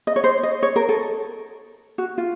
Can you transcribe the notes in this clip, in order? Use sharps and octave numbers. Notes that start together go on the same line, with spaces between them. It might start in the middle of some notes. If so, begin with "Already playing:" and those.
D#5
C#5
C5
D#5
C#5
A#4
A4
F#4
F4